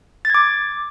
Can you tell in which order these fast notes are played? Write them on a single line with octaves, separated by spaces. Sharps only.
A6 G#6 D6